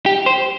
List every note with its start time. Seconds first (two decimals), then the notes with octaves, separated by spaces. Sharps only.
0.06 G4
0.26 C5